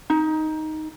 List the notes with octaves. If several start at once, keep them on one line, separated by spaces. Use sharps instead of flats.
D#4